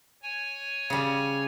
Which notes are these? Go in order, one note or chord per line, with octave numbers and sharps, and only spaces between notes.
C#5 G#5
C#3 G3